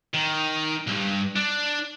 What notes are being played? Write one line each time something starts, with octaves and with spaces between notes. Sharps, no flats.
D#3
B1 G2
D4